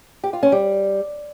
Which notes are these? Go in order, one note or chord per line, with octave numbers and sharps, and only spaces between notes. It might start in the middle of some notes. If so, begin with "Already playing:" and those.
G4
F4
C#4
G3